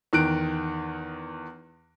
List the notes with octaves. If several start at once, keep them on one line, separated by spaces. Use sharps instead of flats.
E2 D#3 F#6 D7